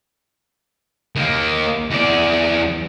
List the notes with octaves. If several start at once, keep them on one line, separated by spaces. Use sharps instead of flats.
D#2 A#3
E2 D5